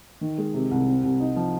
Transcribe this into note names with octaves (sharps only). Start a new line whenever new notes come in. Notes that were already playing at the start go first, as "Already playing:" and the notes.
D#3
G#3
C3
C2
C4
C2
D#4
F3